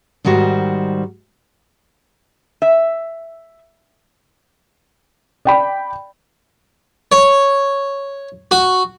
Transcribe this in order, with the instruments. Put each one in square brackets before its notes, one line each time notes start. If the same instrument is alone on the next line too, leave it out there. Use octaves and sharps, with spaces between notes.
[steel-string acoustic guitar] G#2 D#3 G3 F#4 C5
[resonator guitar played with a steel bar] E5
[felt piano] D5 G5 B5
[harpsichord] C#5
F#4